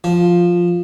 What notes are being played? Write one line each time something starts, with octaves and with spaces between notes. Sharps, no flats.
F3